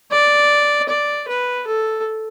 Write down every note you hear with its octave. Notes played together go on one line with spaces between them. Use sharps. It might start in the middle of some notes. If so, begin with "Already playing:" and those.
D5
D5
B4
A4